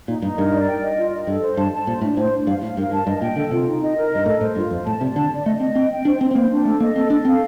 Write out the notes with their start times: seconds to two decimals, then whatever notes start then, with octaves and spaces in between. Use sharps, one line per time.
0.08 A#2 D#4
0.22 G2 D#4
0.37 G2 A#4
0.53 D5
0.68 G5
0.83 D#5
0.97 F4
1.12 D#5
1.27 G2 A4
1.42 C5
1.57 G2 A5
1.72 A5
1.87 A#2 C5
2.02 A2 D4
2.17 A2 C5
2.32 D4
2.47 G2 F5
2.62 A2 F5
2.77 G2 A#4
2.92 G2 A5
3.07 G2 D#5
3.21 A#2 G5
3.36 D3 A4
3.51 C3 F4
3.67 D#4
3.82 D#5
3.96 A#4
4.12 G2 D#5
4.26 A2 A4
4.41 A2 C5
4.56 G2 F4
4.71 F2 C5
4.86 A2 A5
5.01 C3 D5
5.16 D3 A5
5.31 D5
5.46 A3 D#5
5.60 C4 D#5
5.75 C4 G5
5.91 G5
6.05 D4 C5
6.20 C4 C5
6.31 C4
6.35 A#3 C5
6.51 D4
6.65 A3 A4
6.80 A#3 D#5
6.96 C4 A4
7.10 D4 A4
7.25 C4 F5